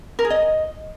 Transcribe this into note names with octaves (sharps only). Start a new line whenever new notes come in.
A#4
G#4
D#5